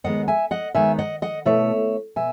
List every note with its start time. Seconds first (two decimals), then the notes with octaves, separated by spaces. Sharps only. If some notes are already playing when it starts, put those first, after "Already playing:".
0.04 D#2 D#3 G#3 B3 D#5 F#5
0.28 E5 G#5
0.51 D#5 F#5
0.75 D#2 D#3 G#3 B3 E5 G#5
0.99 D#5 F#5
1.22 D#5 F#5
1.45 B2 A3 E4 C#5 E5
2.16 B2 E5 G#5